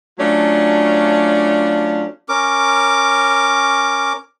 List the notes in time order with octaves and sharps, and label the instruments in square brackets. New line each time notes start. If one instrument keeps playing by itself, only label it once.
[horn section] F#3 A3 C#4 D4 F4
[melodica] C#4 A#4 D6